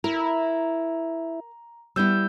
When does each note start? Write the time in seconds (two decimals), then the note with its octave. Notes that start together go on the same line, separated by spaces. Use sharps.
0.04 E4 A#4 A#5
1.96 G3 B3 E4 E6 G6